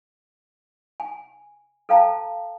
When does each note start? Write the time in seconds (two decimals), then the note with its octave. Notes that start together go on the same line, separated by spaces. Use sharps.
1.00 G#5
1.89 A4 C5 F5 G5 A5 A#5